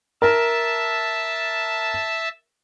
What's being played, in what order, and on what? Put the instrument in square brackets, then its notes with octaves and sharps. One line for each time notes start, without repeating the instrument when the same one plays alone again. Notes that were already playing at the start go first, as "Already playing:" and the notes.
[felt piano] A#4 [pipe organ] E5 A5